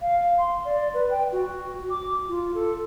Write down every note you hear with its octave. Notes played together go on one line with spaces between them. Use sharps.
F5
C6
D5
B4
G5
F#4
D6
F4
A4